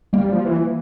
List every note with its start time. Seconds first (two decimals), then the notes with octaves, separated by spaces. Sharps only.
0.13 G3 A#3
0.32 F3
0.45 E3